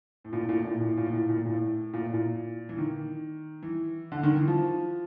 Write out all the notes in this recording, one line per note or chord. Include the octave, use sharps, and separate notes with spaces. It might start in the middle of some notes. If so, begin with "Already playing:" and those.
A2
A#2
A2
A#2
A2
A#2
A2
A#2
A2
A#2
A2
A#2
A2
A#2
A2
A#2
A2
A#2
A2
A#2
E3
D#3
E3
D3
D#3
E3
F3